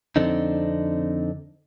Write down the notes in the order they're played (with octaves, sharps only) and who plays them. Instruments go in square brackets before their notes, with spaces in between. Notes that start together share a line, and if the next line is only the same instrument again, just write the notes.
[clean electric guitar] F2 D3 C4 D4 D#4